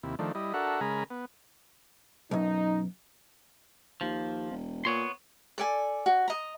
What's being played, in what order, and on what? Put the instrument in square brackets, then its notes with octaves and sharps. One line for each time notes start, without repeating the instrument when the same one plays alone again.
[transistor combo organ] D#2 C3 E4
D#3 F3 A3 D4
G3 E4 D#5
D4 F#4 A4 A#4 E5 F#5
C#3 G#3 A#4 G#5 A#5 B5
B3
[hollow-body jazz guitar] B1 F#2 [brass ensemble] D#4
[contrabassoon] D#2 [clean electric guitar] F3
[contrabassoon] E1
[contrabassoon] A#2 [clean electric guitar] B3 C#5 C6
[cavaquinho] A4 D5 G#5
F#4
D#5 A#5